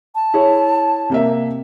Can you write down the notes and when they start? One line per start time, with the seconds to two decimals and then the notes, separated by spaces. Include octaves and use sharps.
0.15 A5
0.34 E4 G#4 C#5
1.10 C3 A#3 E5